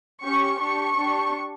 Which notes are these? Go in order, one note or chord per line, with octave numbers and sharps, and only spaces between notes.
C#4 G4 C#6
D4 G4 C#6
D4 G4